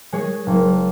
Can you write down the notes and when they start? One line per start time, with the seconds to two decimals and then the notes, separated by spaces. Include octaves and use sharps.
0.13 G#3 C#5
0.47 F#1